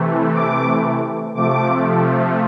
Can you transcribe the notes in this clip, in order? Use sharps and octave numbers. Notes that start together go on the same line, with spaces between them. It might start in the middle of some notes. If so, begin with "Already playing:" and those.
Already playing: C3 E3 A3
D6
C3 F3 A3 D6